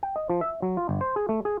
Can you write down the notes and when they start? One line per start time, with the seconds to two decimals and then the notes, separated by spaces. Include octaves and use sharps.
0.03 G5
0.16 D#5
0.29 F3
0.41 E5
0.62 F#3
0.77 F4
0.89 G1
1.01 C5
1.16 G#4
1.29 A3
1.45 G#4